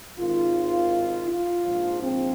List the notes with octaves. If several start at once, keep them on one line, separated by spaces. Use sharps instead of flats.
G#1 G#2 D#3 F4
F4
A#1 G#2 F3
C4